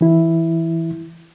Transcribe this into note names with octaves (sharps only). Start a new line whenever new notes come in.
E3 E4